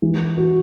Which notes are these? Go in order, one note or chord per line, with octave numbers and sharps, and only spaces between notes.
E3
F#4